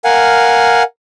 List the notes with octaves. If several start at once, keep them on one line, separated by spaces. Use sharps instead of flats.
A#4 F5 F#5 G#5